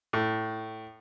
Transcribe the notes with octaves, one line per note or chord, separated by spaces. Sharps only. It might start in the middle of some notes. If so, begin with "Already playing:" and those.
A2